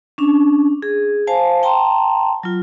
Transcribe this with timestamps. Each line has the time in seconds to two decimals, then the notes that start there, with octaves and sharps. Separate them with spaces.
0.18 C#4 D4
0.82 G#4
1.27 C5 F5 G#5 A5
1.63 G5 A5 A#5 C6
2.43 F#3 F4